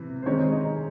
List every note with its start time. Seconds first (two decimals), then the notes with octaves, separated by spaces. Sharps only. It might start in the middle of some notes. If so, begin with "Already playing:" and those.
Already playing: C3 E3
0.22 C5
0.26 D#3 G#3 C4 C#4 D#4 C#5
0.52 D#4 D#5